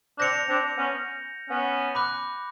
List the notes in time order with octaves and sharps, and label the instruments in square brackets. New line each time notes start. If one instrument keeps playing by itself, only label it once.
[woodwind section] C4 D4 [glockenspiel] G6 A#6 C#7 F7
[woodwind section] C4 D4
B3 C#4
B3 C#4
[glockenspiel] B5 D6 F#6